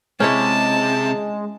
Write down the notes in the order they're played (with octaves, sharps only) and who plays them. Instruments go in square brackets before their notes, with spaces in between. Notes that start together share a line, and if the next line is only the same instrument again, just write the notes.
[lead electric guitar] C3 [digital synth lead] G#3 [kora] C#4 E4 C#5 [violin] A5